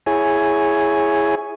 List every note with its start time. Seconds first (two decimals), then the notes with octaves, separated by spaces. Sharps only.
0.06 E4 G#4 C#5 G#5